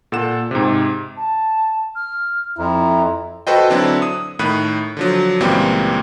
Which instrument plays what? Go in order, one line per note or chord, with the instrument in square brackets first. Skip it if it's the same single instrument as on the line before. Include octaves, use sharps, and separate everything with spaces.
[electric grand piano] A#2 A4 F#5 E7
G#2 C3
[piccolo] A5
F6
[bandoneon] F2 [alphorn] E4 [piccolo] A#5
[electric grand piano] F#4 A4 B4 C5 D#5 G5
D3 F#3 C4 D4 E4 A4
D#6
A2 D#3 B5 F#6 D#7
D3 F3 F#3
C#2 A#2 E3 G3 A#3 C4